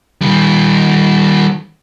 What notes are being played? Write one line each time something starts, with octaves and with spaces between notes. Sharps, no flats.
D#3 G3